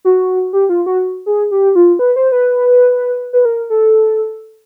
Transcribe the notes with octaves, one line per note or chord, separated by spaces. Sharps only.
F#4
G4
F4
F#4
G#4
G4
F4
B4
C5
B4
B4
A#4
A4